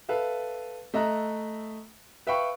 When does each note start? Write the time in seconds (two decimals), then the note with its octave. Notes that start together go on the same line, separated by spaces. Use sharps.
0.09 A4 B4 E5 F5
0.94 A3 D#5 E5 A#5 F#6
2.27 B4 E5 F5 G5 B5 C#6